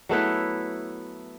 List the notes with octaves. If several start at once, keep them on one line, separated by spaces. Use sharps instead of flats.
F#3 A3 B3 E4